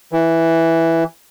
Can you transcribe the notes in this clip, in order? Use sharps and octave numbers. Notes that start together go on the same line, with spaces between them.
E3